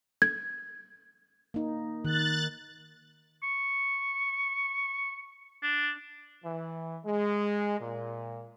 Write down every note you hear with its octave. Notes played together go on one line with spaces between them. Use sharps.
G#6
A#3 D#4
D#3 F#6 A6
C#6
D4
E3
G#3
A#2